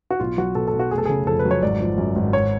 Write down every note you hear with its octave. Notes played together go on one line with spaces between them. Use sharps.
F#4
B1 F4
F#3 F#4
B2 A4
A4
B1
F#4
F1 G#4
A4
C#3 G#4
F2 A4
B4
F#3
C#5
G#1 D5
F3
F#2
G#1
G#1 C#5